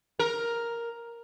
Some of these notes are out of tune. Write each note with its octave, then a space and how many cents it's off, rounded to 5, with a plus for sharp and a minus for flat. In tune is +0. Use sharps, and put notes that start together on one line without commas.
A#4 +5